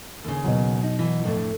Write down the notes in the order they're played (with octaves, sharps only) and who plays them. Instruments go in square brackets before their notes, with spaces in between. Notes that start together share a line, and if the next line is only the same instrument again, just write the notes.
[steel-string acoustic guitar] D#2 C#3
[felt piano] B2 F#3
[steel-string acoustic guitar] D#4
E3
F2 A2 D3